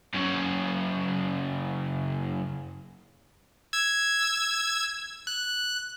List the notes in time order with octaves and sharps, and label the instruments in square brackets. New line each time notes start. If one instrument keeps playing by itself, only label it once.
[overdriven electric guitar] F#2 C#3
[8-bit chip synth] E6 G#6
F#6